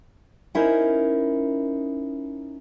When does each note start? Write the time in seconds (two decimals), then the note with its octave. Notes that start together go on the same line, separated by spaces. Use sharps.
0.55 C#4 D#4 E4 A#4 C5